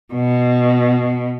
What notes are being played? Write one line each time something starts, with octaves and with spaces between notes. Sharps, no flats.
B2